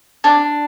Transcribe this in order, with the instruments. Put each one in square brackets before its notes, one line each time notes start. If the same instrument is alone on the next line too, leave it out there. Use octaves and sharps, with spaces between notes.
[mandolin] D4